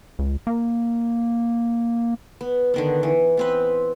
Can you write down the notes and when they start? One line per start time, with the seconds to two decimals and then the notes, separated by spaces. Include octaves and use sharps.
0.19 C#2
0.47 A#3
2.41 B3
2.74 D3 D#3 B3
3.03 E3
3.37 B3 C4 B4